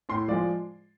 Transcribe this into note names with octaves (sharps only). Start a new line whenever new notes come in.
A2 C6
F3 G#3 D5